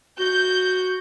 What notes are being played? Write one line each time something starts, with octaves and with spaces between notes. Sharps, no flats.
F#4 G6